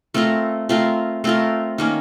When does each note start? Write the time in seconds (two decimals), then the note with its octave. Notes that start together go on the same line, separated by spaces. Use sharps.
0.14 A3 C4 F4 A#4
0.69 A3 C4 F4 A#4
1.24 A3 C4 F4 A#4
1.78 D#3 A#3 C#4